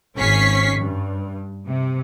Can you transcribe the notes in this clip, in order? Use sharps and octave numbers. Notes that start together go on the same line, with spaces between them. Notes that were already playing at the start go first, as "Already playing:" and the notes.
G#1 C#4 C#6 B6 C7
G2
C3